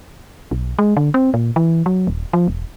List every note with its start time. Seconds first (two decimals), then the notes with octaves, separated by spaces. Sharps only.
0.51 B1
0.79 G#3
0.97 D3
1.14 C4
1.34 A#2
1.56 E3
1.86 F#3
2.07 D#1
2.33 F3
2.48 E1